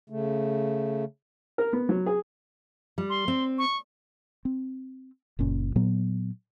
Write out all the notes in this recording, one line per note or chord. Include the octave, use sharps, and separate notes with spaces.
C#3 A3
A#4
B3
F#3
G#4
G3
C6
C4
C#6
C4
F#1 A#2 C#4
A#2 F#3 B3